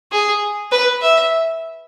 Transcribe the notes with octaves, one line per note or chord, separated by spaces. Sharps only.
G#4
B4
E5